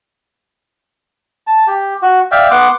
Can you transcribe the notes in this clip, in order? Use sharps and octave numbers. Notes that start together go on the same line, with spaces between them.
A5
G4
F#4
D5 E5 F5 G5
B3 F#5 C6 D6